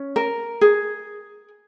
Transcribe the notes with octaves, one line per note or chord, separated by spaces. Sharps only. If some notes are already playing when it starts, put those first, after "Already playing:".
Already playing: C#4
A#4
G#4